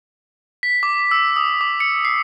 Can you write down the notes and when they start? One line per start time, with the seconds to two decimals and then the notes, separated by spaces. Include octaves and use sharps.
0.63 B6
0.83 D6
1.11 E6
1.36 D#6
1.61 D6
1.80 C#7
2.05 C7